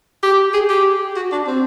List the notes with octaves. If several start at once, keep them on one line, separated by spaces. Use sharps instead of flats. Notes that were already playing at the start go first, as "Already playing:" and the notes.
G4
G#4
G4
F#4
D4
C4